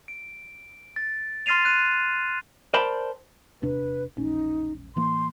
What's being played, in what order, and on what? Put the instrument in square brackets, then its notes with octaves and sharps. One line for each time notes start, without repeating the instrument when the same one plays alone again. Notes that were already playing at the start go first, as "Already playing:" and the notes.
[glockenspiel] D7
A6
C6 F6 A6 C7 D#7 F7
F#6 D#7
[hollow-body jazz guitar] A#4 C5 D5 G5 A5 B5
[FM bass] D#1 [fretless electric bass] E2 C3 D4 [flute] B4
[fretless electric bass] E1 C#4 [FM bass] A#1 [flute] D#4
[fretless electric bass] A2 E3 A#3 [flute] C6